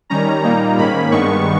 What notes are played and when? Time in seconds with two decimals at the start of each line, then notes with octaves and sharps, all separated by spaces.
0.10 D#3 G3 C#4 A#5
0.43 A#2 G3 A#3 D#4 A#5
0.78 G#2 D#3 A#3 C#4 B5
1.12 G2 D#3 G#3 B3 C#6